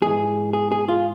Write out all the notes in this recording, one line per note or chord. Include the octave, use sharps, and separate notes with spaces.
G#2 E3 G#3 G#4
G#4
G#4
F4